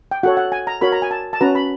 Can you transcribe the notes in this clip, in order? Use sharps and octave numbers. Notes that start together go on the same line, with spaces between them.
G5
F#4 A4 C#5 F#5
F#5
G#5
A#5
F#4 A#4 C#5 B5
A#5
G#5
A5
A5
C#4 F#4 B4 A#5
B5